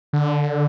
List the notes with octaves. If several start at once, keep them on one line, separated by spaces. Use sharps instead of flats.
D3